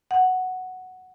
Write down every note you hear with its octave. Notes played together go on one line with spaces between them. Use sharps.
F#5